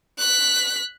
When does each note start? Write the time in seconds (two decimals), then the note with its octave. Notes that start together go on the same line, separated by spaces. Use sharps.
0.19 F#6 B6